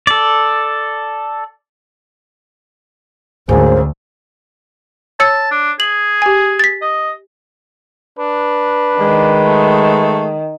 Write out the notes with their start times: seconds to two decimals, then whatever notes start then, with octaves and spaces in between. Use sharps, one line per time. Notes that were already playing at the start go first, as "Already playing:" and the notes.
0.07 A4 D5
3.49 D2 G#2 D3 A#3 C#4 G#4 C5
5.20 C#5 A5 E6 C#7
5.51 D4
5.80 G#4 F#7
6.22 G4 G#5
6.59 A6 B6
6.82 D#5
8.19 D4 B4
9.00 D#3 G#3
9.43 A3